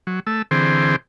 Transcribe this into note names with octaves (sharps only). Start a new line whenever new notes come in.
F#3
A3 E6
D3 E3 C4 G#4 C5